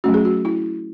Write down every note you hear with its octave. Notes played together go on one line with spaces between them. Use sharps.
F#3 A3 C#4 F#4
G#4
F#4
E4